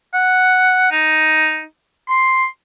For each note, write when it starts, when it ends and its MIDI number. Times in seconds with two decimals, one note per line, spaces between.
0.14 0.91 78
0.91 1.63 63
2.08 2.44 84